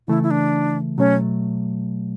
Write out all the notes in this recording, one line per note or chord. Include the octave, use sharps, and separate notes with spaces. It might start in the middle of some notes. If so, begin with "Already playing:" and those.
C#3 E3 A3 E4
E4
D4
B2 F#3 A3 C#4